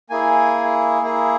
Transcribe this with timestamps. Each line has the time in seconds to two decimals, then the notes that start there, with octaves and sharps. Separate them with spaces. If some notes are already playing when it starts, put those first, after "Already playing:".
0.10 A#3 E4 G#4 G#5
1.02 A#3 E4 G#4